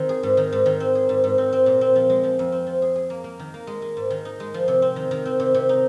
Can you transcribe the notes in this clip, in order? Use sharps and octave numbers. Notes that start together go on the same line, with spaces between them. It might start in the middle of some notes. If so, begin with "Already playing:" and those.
Already playing: D#3 C4
G#4
G#2
D#3
G#2
D#3
C4
G#4
G#2
G#2
C4
C4
A#2
C4
F3
G#3
F3
F2
C4
F3
G#4
G#4
A#3
A#3
D#3
A#3
G#3
G#3
G#2
D#3
D#4
G#3
F3
C3
C4
D#3
D#3
C4
C3
C3
D#4